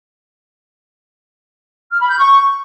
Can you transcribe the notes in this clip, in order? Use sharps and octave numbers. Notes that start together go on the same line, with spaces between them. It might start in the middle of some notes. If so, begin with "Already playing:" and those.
F6
B5
G6
C#6